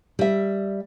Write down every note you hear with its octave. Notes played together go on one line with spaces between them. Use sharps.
G3 E5